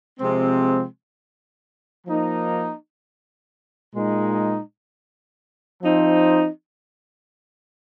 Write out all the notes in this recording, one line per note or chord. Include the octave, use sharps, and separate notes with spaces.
C3 F3 G#3 C4
F3 A#3 D#4
A#2 G#3 D#4
F3 C4 D#4